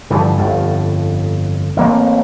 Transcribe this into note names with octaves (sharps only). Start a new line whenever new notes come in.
G2 D3 E3 F3
G1 F2 A2
A1 A#3 C4